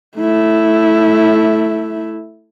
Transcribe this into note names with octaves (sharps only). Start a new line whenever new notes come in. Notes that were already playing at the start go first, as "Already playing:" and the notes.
A3 E4